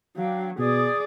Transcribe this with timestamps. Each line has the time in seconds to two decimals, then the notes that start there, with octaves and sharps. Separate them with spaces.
0.16 F#3 D4 F5 G5
0.58 B2 G#4 D5 D#6